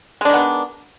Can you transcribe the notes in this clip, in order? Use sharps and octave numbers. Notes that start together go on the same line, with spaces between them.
D#3 G#3 B3 D4